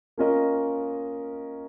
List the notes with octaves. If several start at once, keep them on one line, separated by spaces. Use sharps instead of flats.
A#3 C#4 F4 A#4 D#5